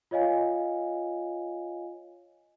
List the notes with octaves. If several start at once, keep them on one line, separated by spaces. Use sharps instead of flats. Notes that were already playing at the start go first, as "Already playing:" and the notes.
F4 C#5 D#5 F5 G#5